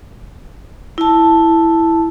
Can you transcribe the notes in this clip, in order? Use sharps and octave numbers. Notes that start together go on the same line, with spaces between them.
E4 A5